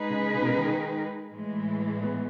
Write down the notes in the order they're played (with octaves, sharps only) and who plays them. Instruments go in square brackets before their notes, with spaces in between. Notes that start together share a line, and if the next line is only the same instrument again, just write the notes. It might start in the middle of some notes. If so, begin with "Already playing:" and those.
Already playing: [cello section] G#3 D#4 G#4 B4
[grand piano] C#3
C#3
B2
C#3
D#3
[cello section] A2 E3 G#3
[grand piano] B3